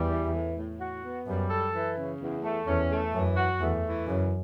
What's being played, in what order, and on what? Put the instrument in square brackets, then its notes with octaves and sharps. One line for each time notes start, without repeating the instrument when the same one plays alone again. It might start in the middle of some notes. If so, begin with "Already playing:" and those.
Already playing: [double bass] E2 [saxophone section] G3
[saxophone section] E3
A2
A2
F#4
B3
[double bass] F#2 [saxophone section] G3
[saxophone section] A4
E3
C#3
E2
A3
[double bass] E2 [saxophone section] C#4
[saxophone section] A3
[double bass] F#2 [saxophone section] E3
[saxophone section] F#4
[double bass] E2 [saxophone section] A3
[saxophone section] E3
[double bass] F#2 [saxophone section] C#3